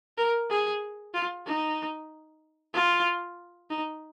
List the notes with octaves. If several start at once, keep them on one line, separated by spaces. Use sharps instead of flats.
A#4
G#4
F4
D#4
F4
D#4